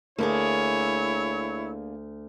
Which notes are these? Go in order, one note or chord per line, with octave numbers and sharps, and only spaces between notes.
D2 A#3 D4 E4 G#4 C#5